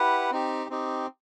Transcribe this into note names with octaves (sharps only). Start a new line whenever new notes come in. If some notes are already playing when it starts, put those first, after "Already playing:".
Already playing: E4 G4 B4 F#5
C4 D#4 G4
C4 D#4 G4